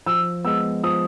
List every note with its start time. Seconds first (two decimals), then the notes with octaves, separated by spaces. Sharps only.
0.06 F3 E6
0.45 G#3 B3 E6
0.83 F3 D#6